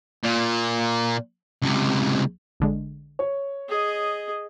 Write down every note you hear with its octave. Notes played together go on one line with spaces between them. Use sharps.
A#2
C#2 C3
A1 D3 G#3
C#5
G#4 D#5